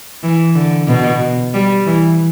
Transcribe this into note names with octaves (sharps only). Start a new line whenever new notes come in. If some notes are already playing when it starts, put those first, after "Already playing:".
E3
D3
B2
G3
E3